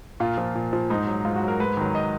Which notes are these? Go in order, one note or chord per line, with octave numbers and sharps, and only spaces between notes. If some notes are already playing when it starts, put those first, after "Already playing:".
A#2 F4
F3
A#2
F3
G#2 D#4
F#3
G#2 F4
F#4
F#3
A#4
G#2 B4
D#3 F#3
D#5